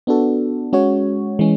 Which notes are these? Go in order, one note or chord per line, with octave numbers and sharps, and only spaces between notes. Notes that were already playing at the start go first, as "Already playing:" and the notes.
B3 D4 F#4 A4
G#3 C#4 F#4 C#5
E3 G#3 C#4